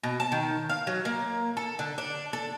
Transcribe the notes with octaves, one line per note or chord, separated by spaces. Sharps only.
B2
A5
D#3
F5
F#3
A#3
A4
D3
D4
A4